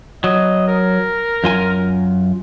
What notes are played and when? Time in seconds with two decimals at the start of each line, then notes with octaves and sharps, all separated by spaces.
0.24 F#3 D#5
0.68 A#4
1.44 F#2 F4 G#5